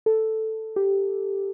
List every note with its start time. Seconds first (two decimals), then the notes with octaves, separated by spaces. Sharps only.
0.06 A4
0.76 G4